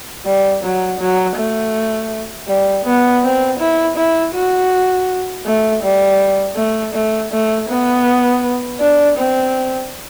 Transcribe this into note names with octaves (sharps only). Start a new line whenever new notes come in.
G3
F#3
F#3
A3
G3
B3
C4
E4
E4
F#4
A3
G3
A3
A3
A3
B3
D4
C4